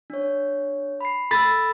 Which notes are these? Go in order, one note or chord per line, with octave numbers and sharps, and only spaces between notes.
D4 C#5
B5 C7
A4 B5 E6 A6